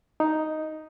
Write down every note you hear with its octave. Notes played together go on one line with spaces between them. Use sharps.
D#4